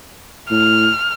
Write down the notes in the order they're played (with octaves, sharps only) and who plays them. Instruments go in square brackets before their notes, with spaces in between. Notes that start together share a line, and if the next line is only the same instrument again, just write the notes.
[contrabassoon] A2 [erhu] F6